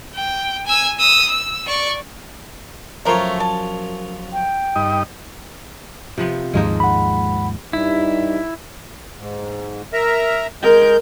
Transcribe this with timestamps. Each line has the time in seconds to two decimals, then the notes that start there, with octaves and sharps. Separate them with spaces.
0.15 G5
0.66 G#5 E6
0.99 D#6 E6
1.29 E6
1.68 D5 C#6
3.06 F#2 F3 A3 A#4 C5 C#5
3.40 A5
4.33 G5
4.76 G2 D#4 D#5
6.18 C3 F3 B3
6.54 D#2 G#2 F3 G#3 A#3 D#4
6.80 F#5 B5
7.73 G2 G3 D#4 E4
9.19 G#2
9.93 A#4 E5 A#5
10.63 G#3 A#4 G6